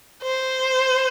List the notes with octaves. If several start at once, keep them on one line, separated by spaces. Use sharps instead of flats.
C5